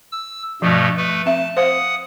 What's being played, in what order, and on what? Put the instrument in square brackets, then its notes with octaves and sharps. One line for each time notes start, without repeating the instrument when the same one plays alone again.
[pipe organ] E6
[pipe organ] G2 B2 A3 [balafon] F3
[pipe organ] A3 B4
[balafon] C4 E5 [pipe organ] A5
[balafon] C5 F5 [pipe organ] F#5 D#6